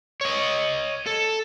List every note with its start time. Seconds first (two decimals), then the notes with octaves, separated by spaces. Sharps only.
0.21 C#5 D#5
1.07 A4